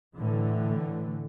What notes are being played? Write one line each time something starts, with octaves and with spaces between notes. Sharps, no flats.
A2 D3 E3 A3